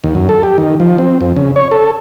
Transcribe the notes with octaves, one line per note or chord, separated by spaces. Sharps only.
D#2
F#2
A4
G4
D#3
F3
C4
F2
C#3
C#5
A4